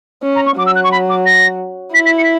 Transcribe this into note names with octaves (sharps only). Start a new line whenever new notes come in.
C#4
A#5
C#6
F#3 D6
E6
F#6
C#6
B5
D6
A#6
E4 B6
B6
C#7
B6